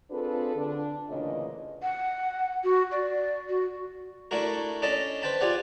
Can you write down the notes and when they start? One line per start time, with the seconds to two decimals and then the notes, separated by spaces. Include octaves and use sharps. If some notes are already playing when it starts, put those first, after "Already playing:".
0.11 C4 D4 F4 G#4 A4 B4
0.55 D3 D4
1.09 D2 A#2 C#3 E3 C#5 D#5
1.83 F#5
2.64 F#4
2.92 D5
3.49 F#4
4.31 A3 D4 E4 F#4 A#4
4.82 C#4 D4 A4 D#5 A5 B5
5.22 B4 C5 G5 A5 B5
5.41 F4 G4 G#4 D5 F#5